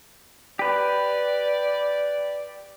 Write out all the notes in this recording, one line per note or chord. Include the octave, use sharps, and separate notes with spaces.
G4 B4 D5